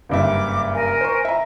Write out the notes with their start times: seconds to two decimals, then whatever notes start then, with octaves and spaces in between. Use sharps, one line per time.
0.09 F#1 G2 E5 D6
0.74 A#4 G#5
1.01 C5 C#6
1.25 E5 A#5